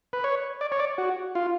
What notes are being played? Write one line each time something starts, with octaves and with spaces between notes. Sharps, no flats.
B4
C#5
D5
C#5
D5
F#4
F4